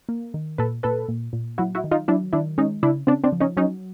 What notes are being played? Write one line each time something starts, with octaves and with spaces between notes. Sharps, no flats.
A#3
D#3
A#2 A4 B4
A#2 A4 B4
A#2
A#2
F#3 E4 F#4
E4 F#4
D#3
D#4 F4
F#3 D4 E4
D#3 D4 E4
G#3 C#4 D#4
C#3 D4 E4
C#3 C4 D4
C4 D4
F3
C#4 D#4
F#3 C#4 D#4